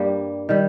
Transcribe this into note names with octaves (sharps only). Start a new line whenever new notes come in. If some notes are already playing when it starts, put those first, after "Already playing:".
Already playing: G2 G3 A#3
D#3 G3